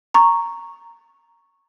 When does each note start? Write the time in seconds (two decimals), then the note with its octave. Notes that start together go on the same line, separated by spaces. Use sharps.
0.14 A#5 C#6